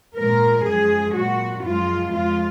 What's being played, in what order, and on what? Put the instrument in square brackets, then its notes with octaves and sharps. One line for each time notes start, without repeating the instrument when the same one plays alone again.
[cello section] A#2 F3 G#3 A#4
F#2 F3 G#3 G#4
A#2 F#3 F#4
F#2 F3 G#3 F4
F2 F3 G#3 F4